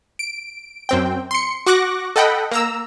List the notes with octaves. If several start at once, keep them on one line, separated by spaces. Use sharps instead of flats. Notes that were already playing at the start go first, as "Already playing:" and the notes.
D7
F#2 C4 G5
C6 C#7
F#4 C#6 D6 F#6 A#6
A4 D#5 F#5 G5 B5
A#3 A#5 E6